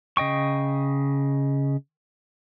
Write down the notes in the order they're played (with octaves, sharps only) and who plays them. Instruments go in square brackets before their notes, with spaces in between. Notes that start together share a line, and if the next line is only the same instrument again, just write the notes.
[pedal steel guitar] C#3 D#5 G5 C#6